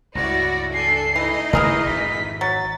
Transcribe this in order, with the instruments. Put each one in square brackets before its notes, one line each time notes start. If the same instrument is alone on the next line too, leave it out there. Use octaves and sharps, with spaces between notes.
[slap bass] C#2 G2 [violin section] E4 F#4 D5 [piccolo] A#6
[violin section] D4 A4 G#5 [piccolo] C7
[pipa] E3 [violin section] D#4 E4 D#5
[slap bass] C#3 G#3 A#3 [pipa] E3 G#4 A#4 [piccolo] C7
[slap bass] G#1 F2 [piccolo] B6
[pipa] F#3 [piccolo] A6